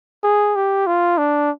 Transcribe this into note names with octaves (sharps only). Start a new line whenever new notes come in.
G#4
G4
F4
D4